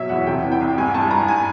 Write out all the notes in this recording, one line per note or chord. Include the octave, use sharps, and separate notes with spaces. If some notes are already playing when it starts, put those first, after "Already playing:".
Already playing: B2 F#3 C#5 E5
E2 F#5
C3 G5
E3
G5
C2
G2 G#5
G2 A5
G2 A#5
G#5